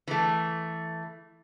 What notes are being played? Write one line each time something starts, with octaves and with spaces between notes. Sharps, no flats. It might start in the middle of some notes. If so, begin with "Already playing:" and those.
E3 A3